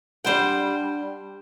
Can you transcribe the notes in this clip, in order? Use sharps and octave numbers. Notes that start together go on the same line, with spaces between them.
G3 D4 C5 F#5 G5